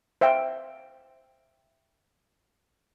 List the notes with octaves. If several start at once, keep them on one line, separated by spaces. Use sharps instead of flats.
C5 E5 F5 G5